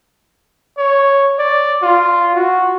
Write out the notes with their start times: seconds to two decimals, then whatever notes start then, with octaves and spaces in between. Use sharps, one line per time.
0.78 C#5
1.39 D5
1.83 F4
2.35 F#4